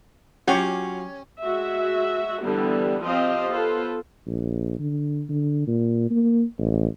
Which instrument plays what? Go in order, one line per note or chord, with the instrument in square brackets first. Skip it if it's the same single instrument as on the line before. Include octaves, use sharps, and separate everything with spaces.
[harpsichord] F#3 F4 F5 [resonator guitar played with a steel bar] C#4 [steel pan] G4 C#5 [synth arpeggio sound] F#5
[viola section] G#3 F#4 E5
D3 E3 G3 B3
F3 C4 F4 G4 C5 D#5
B3 F4 A4 B4 C5
[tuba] A#1
D3
D3
A#2
A#3
A1